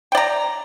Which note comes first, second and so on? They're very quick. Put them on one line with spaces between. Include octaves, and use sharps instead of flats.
G5 D5 A#5